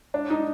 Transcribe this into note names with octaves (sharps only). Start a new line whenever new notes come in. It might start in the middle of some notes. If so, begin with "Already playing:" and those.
D4
D#4